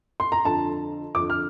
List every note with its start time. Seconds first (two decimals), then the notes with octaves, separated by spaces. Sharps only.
0.20 C6
0.32 A#5
0.45 F2 D3 A5
1.15 F2 D3 D6
1.30 F6